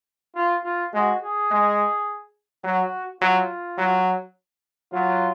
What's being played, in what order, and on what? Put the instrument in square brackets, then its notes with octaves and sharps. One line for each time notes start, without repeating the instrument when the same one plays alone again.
[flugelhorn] F4
F4
[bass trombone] G#3 [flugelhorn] F#4
[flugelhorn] G#4
[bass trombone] G#3
[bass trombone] F#3 [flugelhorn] F#4
[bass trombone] F#3 [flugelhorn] F4
[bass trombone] F#3
[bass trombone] F#3 [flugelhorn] F4